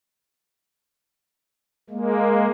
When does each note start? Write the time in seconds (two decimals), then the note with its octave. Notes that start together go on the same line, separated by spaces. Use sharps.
1.90 G#3 A#3